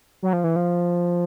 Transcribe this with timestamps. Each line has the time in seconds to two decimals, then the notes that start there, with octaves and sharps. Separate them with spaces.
0.23 F#3
0.33 F3
0.44 E3
0.56 F3